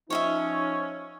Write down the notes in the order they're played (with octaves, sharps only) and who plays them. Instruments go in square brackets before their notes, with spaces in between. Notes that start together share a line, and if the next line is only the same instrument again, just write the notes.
[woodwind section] F3 C#4 [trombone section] D#4 [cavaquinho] C#5 D#5 E5